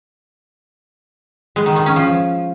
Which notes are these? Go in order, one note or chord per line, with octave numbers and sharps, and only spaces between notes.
G#3
D#3
D#3
C#4
F3